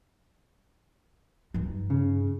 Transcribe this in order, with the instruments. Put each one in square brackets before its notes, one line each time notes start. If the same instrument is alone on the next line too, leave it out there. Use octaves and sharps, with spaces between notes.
[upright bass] G2 D#4
[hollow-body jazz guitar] C#3